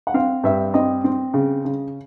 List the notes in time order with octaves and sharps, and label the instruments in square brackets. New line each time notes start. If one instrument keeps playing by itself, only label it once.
[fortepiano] F#5
C4 F5
G2 E5
C4 D#5
C4
C#3
C#3